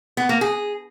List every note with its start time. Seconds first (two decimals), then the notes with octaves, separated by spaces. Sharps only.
0.17 B3
0.29 A#3
0.41 G#4